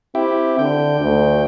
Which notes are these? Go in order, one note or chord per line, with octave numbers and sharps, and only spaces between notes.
C4 E4 G4
D3 G5
D2